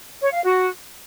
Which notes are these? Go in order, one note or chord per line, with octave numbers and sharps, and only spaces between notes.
C#5
F5
F#4